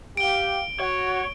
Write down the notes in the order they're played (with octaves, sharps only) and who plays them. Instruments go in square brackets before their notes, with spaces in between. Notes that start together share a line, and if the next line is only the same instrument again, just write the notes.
[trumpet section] G4 F5 [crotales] D7 G7
[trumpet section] F#4 [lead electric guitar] C#5